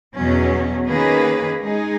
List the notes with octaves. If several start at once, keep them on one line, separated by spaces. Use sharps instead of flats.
E2 B2 F#3 C#4
D#3 A#3 C#4 G#4 B4
G#3 D#4 G#4